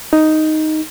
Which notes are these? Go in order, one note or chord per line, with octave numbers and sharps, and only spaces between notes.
D#4